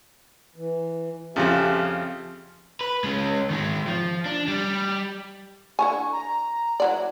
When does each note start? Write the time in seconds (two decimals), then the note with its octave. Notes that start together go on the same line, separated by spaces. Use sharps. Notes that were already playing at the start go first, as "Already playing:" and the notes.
0.56 E3
1.36 F2 C#3 F3 G4 E5 G#5
2.81 B4
3.04 G#3 C#4
3.50 D#3 G#3
3.88 F3
4.26 D4
4.48 G3
5.79 D3 E4 G#5 C#6
6.12 A#5
6.80 E3 F#3 D5